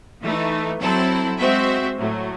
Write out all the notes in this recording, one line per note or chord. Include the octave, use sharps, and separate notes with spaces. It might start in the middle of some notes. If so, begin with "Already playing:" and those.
E3 A3 D#4
F#3 C4 E4 A4
G#3 C4 F#4 C5 E5
A2 F#3 A3